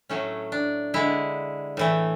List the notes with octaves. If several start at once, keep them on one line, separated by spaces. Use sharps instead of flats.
A2 F#3 A3 C#4
D4
D3 G#3 E4
A2 E3 A3